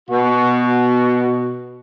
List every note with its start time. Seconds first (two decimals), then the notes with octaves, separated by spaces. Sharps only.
0.09 B2 F#4